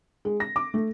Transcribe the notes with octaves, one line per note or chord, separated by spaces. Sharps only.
G#3
A#6
D6
A3